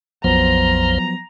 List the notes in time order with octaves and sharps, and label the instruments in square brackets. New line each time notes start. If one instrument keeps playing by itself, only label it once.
[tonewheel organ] A#1 F2 C5 [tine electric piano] F3 F#3 B3 [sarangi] A#5